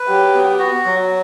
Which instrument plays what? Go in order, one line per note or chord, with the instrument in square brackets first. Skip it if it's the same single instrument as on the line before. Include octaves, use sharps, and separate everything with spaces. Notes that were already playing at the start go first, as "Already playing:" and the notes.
Already playing: [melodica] B4
[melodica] F#3 [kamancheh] G4
[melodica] B3
F#4
F#3